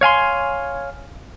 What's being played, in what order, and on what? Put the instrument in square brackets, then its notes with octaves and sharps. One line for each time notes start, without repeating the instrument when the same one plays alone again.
[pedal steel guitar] C#5 F5 G#5 C6